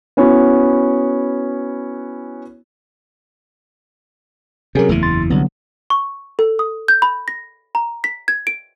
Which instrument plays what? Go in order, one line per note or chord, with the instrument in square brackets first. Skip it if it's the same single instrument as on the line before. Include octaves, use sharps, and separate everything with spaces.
[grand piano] B3 C#4 E4 F#4
[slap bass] C3 F#3 [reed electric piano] C#4 G#4 A#4
[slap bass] F#1 E2 E3 [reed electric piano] A3
[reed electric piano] C6 A6
[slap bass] C2 [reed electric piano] D3 F#3 B3
[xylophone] C#6
A4
D#6
G6
B5
A#6
A#5
B6
G#6
D7